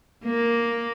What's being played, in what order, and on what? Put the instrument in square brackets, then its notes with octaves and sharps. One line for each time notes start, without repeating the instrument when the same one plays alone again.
[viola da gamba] A#3